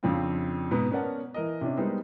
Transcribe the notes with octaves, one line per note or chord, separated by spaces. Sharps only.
F2 C#3 F3 C4 D4 F4
G#2 B2 B3 B4 D#6
B3 C#4 A#4 D5 F#5 A5
E3 A#4 D#5
C3 C#4 D4
G3 G#3 B3 D#4 A#4 C5